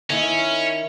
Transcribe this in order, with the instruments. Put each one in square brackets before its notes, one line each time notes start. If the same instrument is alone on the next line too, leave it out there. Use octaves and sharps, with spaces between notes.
[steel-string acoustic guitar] D#3 E4 [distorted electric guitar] C#4